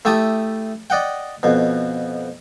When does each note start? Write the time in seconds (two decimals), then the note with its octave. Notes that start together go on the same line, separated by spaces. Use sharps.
0.05 A3 E4 G4 A5 D#6
0.90 D5 D#5 F#5 G5
1.43 F2 B2